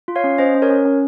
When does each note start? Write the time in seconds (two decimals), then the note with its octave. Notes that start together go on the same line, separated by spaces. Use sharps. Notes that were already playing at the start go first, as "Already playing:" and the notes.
0.08 F4
0.16 C#5 F5
0.24 C#4
0.38 C#4 C5 D#5
0.54 C#4
0.62 A#4 C#5
0.70 C#4
0.85 C#4